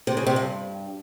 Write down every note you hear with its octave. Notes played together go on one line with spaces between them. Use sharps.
C3
C#3
C3
G2